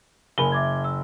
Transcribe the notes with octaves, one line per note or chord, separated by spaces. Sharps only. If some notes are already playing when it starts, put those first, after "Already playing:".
F#1 A#4 G#5 B5 G7
E5 D6 G#6
E6